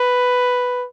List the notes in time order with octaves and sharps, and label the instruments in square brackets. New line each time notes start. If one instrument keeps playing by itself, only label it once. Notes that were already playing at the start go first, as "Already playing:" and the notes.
Already playing: [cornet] B4